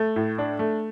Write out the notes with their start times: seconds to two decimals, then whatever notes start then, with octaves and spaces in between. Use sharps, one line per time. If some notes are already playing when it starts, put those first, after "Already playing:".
Already playing: A3
0.16 A2
0.38 D4
0.59 A3